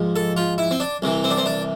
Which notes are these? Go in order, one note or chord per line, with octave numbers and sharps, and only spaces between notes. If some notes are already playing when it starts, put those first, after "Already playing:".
Already playing: G#2 F3 G#3
A4
F4
E4
C4
D4
C2 C3 E3
C4
D4
C4
D4